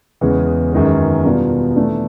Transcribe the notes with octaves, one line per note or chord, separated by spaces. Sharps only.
E2 C#3 E3 G#3 C#4
F#2 D#3 G#3 B3
B2 G3 B3 D4 F4
E3 A3 D4